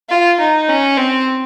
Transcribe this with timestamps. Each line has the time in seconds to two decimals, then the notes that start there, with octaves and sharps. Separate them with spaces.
0.10 F4
0.40 D#4
0.69 C#4
0.97 C4